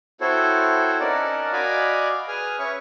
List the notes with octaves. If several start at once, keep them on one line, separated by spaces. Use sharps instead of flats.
C4 E4 F#4 A4 C5 C#5
C#4 D#4 A#4 D5 F#5 A5
F#4 D5 D#5 F5 G#5 B5
G#4 B4 G#5 D#6 F6
C#4 B4 C#5 E5 C#6